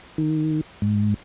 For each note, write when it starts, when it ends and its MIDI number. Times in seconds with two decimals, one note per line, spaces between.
0.18 0.61 51
0.82 1.14 44